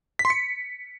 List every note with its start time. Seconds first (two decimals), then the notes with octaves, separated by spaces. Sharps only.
0.19 B6
0.25 C6
0.30 C#7